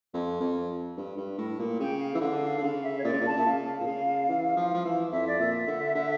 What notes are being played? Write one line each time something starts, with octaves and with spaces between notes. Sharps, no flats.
F2
F2
G2
G2
A2
A#2
C#3 G5
F5
E3
D3 F5
F5
D3
C#3 F5
E5
C#5
A#2 D5
C#3
A#2
C#3 A5
A#2 E5
C#3 F5
A#2
C#3
E3
F3
F3
E3
F2 E5
D5
A#2 E5
D3
D3